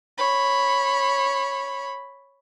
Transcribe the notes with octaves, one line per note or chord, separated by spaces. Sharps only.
C#5 B5